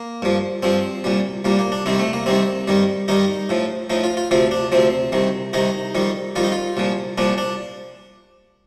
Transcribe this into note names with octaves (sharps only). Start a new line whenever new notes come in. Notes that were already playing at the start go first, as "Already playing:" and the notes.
Already playing: A#3
G2 F3
G2 F3 C4
C2 A#2 G3
C2 A#2 G3 A#3
A#3
D4
C2 C3 D#3 G3 C4
A3
A#3
C2 C3 D#3 G3 C4
G2 D#3 G3
G2 D#3 G3 D#4
A2 F3
A2 F3 D#4
F4
F4
D2 C3 F3 F4
D4
D2 C3 F3 C4
C2 C3 D#3
C2 C3 D#3 D#4
F2 D#3 G3
F2 D#3 G3 F4
D#4
F4
C2 A#2 F3
C2 A#2 F3 D4
D4